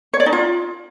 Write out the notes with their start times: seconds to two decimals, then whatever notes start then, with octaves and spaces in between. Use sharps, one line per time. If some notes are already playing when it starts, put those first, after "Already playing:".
0.14 C#5
0.20 D5
0.26 D#4
0.33 F4